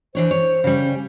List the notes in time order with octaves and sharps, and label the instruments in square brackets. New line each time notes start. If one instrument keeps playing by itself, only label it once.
[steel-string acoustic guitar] E3 D4 C#5 [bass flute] C5
[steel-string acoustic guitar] C#5
C#3 G3
[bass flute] C#4